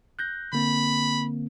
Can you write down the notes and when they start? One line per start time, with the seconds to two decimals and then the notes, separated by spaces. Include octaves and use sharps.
0.19 F#6 G6 A#6
0.53 D3 A#3 C4 B5